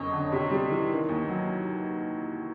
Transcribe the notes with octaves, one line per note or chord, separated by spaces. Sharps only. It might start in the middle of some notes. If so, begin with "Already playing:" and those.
Already playing: F#1 F2 C#5 D#5
D3
C3
G3
E3
D#3
D#2
F#3